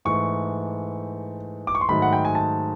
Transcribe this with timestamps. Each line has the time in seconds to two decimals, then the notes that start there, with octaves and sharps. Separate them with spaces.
0.05 G#2 E3 A3 C#6
1.67 D6
1.75 C#6
1.81 C6
1.89 G#2 D#3 F#3 A3 B5
2.02 F#5
2.13 G5
2.25 G#5
2.35 A5